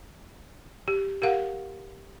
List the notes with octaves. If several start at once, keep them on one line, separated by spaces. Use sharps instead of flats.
G4
G4 A#4 F5 F#5